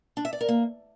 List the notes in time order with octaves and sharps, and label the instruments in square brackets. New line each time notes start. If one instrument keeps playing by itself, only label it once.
[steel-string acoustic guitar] D4
E5
D5
A#4
A#3